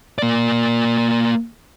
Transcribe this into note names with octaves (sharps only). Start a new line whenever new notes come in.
A#3 D5